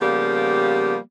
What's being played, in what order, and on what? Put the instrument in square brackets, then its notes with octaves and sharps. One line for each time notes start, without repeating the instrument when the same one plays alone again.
[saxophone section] C#3 F3 G3 A#3 B3 G4